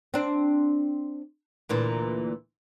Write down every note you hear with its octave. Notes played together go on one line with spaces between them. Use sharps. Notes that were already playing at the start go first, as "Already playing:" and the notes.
C4 D4
D2 A#2 E3